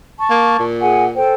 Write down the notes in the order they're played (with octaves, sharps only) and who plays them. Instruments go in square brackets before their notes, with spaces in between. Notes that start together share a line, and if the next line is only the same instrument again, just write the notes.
[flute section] A5 C#6
[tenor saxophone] A#3
A#2
[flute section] G#4 F#5 G#5
A4 C5 G5